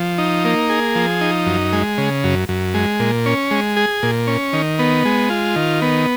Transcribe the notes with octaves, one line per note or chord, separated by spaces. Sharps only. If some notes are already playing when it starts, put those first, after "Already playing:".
Already playing: F3
D#4
A#3
G#4
F3
D#4
F#2
G#3
C#3
F#2
F#2
G#3
A#2
C#4
G#3
G#4
A#2
C#4
D#3
B3
G#3
F4
D#3
B3